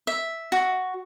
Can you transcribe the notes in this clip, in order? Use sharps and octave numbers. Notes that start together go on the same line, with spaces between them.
E5
F#4